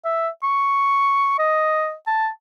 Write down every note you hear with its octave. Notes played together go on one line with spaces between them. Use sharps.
E5
C#6
D#5
A5